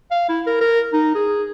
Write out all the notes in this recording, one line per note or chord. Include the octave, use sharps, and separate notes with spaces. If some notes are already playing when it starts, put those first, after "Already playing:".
F5
E4
A#4
A#4
D#4
G#4